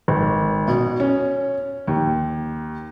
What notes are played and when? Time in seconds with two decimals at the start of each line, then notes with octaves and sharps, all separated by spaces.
0.08 G#1
0.67 B2
1.00 C#4
1.87 D#2